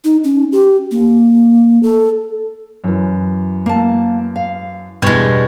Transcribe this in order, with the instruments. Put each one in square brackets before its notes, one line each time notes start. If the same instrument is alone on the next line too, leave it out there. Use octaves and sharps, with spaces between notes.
[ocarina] D#4
C#4
G4
A#3
A4
[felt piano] F#2 E3
[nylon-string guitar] A#3 A5
F5
[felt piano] E2 C#6 G#6 [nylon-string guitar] B2 D3 [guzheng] G3 G#3